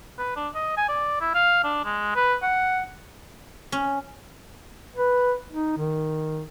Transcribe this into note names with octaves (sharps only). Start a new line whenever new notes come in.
B4
D4
D#5
G#5
D5
E4
F5
D4
G#3
B4
F#5
C#4
B4
D#4
D#3